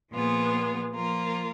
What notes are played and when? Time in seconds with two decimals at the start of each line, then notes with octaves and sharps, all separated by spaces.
0.11 A#2 F3 B3 F4 G#4
0.93 F3 A#3 F4 A#4